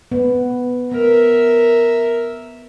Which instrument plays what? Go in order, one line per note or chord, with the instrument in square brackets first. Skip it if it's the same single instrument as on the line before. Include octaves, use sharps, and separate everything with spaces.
[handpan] B3
[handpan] B3 [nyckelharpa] A#4 E5